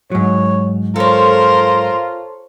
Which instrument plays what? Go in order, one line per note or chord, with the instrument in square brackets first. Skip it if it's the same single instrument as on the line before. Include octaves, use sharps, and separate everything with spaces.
[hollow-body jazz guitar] G#2 F#3 [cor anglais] C#5
[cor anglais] F4 [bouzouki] A4 C#5 [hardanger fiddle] A#4 C5